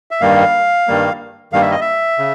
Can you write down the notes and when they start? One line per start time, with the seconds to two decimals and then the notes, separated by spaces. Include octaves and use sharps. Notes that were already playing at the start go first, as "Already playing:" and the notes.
0.11 E5
0.21 G2 D#3 G3 A#3 F5
0.88 G2 D#3 G3 A#3
1.52 G2 D#3 G3 A#3 F5
1.62 E5
1.71 D#5
1.81 E5
2.19 C#3